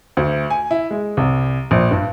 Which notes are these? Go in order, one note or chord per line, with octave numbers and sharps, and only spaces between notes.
D2
G#5
E4
G#3
C2
A#1
G2